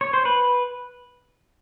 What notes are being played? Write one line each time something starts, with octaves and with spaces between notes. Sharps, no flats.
C#5
C5
B4